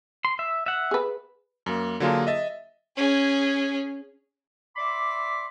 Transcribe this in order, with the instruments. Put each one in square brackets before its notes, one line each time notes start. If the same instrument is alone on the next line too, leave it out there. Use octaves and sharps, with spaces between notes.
[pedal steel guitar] C6
E5
E5 F#5
[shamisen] G#4 B4
[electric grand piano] F#2 A#3
D3 F#3 A#3 F4 G#4 A#4
D#5 E5 A6
[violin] C#4 G#4
[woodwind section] D5 E5 B5 C6 D6